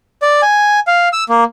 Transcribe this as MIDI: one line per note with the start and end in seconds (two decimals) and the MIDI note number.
0.22 0.41 74
0.42 0.80 80
0.87 1.09 77
1.13 1.24 88
1.29 1.44 58